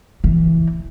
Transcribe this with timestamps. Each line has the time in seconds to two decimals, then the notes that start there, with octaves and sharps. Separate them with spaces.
0.24 E3